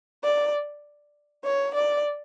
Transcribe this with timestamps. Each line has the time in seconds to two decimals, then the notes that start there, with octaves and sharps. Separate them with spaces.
0.24 D5
1.45 C#5
1.75 D5